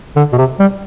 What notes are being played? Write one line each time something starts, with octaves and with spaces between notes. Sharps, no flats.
D3
B2
C3
G3